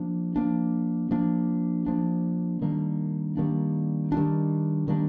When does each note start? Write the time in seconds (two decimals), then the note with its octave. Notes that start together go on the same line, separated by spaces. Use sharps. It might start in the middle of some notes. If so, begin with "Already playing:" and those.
Already playing: F3 A#3 D4
0.36 F3 A#3 D4
1.11 F3 A#3 D4
1.86 F3 A#3 D4
2.62 D#3 G3 A#3 D4
3.37 D#3 G3 A#3 D4
4.12 D#3 G3 A#3 D4
4.88 D#3 G3 A#3 D4